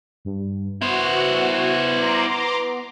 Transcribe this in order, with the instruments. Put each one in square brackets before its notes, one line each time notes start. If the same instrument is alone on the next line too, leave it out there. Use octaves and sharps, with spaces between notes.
[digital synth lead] G2
[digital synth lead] B3 [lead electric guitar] E4 C5 [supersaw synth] F#4
[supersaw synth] A#5 C6 D6